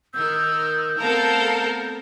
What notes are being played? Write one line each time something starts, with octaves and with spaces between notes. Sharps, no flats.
D#3 A#4 E6 G6
A3 B3 C4 A4 A#4 F5